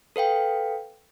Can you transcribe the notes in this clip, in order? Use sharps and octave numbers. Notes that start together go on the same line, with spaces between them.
A4 B4 F5 G5